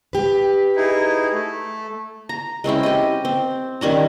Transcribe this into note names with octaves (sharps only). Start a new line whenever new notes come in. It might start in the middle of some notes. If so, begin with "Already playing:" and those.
G4 B4
D#4 E4 G#4
A3
A#5
G#3 C4 C#4 E4
G4 D#5
C4
D#3 G3 C#4 A#5